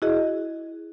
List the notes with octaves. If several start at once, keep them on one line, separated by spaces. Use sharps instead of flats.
E4 F#4 G#4 D#5